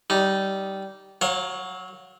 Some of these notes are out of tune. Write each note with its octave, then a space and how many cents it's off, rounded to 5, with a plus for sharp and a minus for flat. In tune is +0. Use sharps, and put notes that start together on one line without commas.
G3 -15 D#4 +0
F#3 +0 C#5 -40 F5 +20